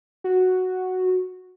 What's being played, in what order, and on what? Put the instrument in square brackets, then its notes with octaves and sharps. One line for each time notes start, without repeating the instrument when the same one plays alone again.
[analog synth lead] F#4